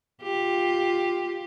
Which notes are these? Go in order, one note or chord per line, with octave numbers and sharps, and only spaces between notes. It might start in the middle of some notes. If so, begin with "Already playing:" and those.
F4 G4